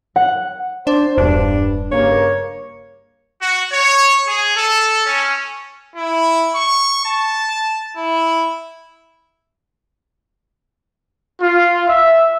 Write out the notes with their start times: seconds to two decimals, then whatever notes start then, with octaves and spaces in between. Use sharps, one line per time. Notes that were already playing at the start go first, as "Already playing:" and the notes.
0.16 F#5
0.87 D4 C5
1.18 E1 G2 D4
1.92 G2 C#3 A#3 C#5
3.42 F#4
3.72 C#5
4.27 G#4
4.56 A4
5.06 C#4
5.96 E4
6.55 C#6
7.06 A5
7.97 E4
11.42 F4
11.89 E5